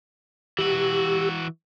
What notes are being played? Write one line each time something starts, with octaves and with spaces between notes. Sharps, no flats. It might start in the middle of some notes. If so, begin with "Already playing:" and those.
E3 F#4 G4 E6